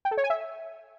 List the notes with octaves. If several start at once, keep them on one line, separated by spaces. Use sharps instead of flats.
G5
A4
C#5
G#5
E5